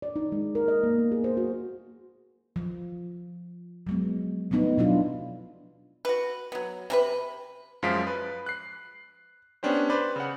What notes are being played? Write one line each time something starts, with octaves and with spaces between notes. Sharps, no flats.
D5
D#4
G#3
A#4
D#5
A#3
B3
G#4
C5
F#4
F3
F#3 G#3 B3
F3 A3 B3 D#4
B2 F#3 D4 E4 F4
F#4 B4
F#3 B3
C3 C#4 B4
F#2 F3 G#3 F5 B6 D7
B4
F#6 C7
B3 C#4 D4 G4 C5
B4 C5 D5
C#3 F#5